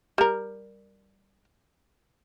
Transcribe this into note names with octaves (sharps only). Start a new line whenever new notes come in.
G3 A#4